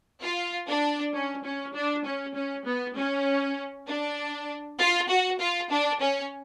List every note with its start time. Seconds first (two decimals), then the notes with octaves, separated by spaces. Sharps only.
0.21 F4
0.67 D4
1.13 C#4
1.44 C#4
1.74 D4
2.04 C#4
2.34 C#4
2.65 B3
2.95 C#4
3.86 D4
4.78 F4
5.08 F#4
5.39 F4
5.70 D4
6.00 C#4